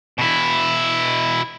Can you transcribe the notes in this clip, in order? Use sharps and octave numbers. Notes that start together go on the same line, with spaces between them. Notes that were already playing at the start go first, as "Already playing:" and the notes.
B2 E4